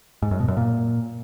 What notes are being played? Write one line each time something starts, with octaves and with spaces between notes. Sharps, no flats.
G#2
F#2
B2
F#2
A#2